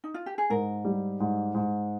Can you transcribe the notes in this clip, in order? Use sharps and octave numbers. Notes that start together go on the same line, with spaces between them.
D#4
F4
G4
G#4
G#2 A#4
G3
G#2
G#2